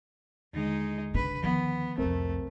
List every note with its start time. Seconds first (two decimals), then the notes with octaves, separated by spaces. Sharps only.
0.53 D#2 D3 G#3 D#4
1.14 C#3 D4 B4
1.43 D#3 F3 B3
1.98 C2 F2 A3 C4 A#4